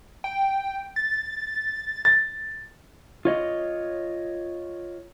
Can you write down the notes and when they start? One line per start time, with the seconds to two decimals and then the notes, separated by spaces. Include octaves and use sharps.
0.24 G5
0.96 A6
2.05 A6
3.25 F4 C#5 D#5